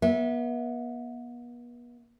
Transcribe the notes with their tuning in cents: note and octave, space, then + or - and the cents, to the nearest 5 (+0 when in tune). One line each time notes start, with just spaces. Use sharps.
B3 -40 E5 -15